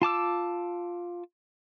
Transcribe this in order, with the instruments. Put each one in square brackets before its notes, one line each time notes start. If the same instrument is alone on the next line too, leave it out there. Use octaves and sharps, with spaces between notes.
[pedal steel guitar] F4 A5 D6 E6